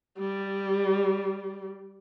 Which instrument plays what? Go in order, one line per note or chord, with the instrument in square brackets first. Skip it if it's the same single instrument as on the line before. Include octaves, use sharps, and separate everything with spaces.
[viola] G3